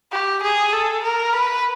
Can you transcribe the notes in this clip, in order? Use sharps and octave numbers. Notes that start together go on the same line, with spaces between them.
G4
G#4
A4
A#4
B4